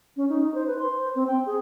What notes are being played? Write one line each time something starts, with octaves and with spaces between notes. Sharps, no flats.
C#4
D#4
D#4
C5
B4
C6
C5
C4
G5
G#4